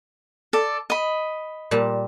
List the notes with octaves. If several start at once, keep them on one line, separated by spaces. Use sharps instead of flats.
A4 D5
D#5 B5
A#2 G3 A5